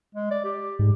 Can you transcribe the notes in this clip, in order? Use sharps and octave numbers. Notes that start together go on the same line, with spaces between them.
G#3
D5
G4
G#2